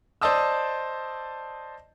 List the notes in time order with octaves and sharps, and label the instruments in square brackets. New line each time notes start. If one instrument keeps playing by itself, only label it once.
[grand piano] C5 D5 D#5 A5 D#6 E6